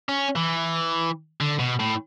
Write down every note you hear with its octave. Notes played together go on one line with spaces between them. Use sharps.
C#4
E3
D3
B2
A2